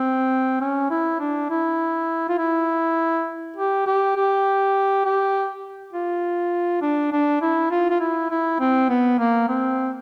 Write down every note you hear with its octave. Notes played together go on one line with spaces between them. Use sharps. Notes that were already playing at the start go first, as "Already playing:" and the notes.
Already playing: C4
C#4
E4
D4
E4
F4
E4
G4
G4
G4
G4
F4
D4
D4
E4
F4
F4
E4
E4
C4
B3
A#3
C4